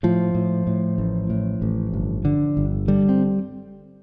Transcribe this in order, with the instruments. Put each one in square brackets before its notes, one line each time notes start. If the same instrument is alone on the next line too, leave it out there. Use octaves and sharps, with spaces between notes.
[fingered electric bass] A2 F3
A2
A2
A1
A2
A1
G1
D3
G1
D3 G3
C4